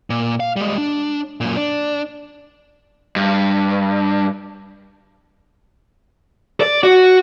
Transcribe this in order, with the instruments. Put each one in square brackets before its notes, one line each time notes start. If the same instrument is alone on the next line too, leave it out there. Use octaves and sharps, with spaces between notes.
[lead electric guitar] A#2
F5
G3 G#3
D4
F#2 A#2
D4
G2
D5
F#4